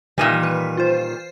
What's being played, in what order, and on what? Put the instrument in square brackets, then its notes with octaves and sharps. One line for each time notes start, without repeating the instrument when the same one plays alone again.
[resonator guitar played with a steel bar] A#2 D#3 G3 [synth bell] E3 D#7
[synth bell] B4
F4 C5